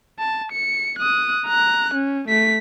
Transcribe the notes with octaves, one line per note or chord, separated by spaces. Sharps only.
A5
C#7
D#6 F#6
A#5 F#6
C#4
A3 B6